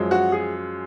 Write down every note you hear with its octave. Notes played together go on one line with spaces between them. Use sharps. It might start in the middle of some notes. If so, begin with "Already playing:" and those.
Already playing: F#2 F3 G#3
F#4
G#4